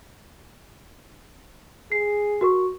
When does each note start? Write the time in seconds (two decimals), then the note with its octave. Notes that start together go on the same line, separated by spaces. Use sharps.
1.92 G#4 C7
2.41 F#4 A#4 C#6